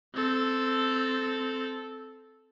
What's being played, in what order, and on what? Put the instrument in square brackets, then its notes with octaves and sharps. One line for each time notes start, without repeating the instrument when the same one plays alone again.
[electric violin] C4 A4